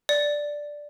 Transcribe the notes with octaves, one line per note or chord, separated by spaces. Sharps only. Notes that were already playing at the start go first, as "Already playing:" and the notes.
D5